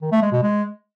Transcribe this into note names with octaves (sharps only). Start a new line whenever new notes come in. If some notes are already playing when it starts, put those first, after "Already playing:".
D#3
A3
G#3
B2
G#3